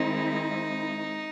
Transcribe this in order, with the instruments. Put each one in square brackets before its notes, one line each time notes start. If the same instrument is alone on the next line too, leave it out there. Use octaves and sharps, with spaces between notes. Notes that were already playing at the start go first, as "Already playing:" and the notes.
Already playing: [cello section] D#3 G#3 C4 E4 [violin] D#4